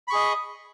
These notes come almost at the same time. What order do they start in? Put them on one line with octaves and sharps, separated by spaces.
B5 C#6 G#4 D#5